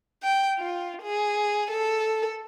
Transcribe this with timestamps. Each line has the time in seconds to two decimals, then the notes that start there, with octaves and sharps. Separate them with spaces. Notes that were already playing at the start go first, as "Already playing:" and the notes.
0.23 G5
0.58 F4
1.03 G#4
1.71 A4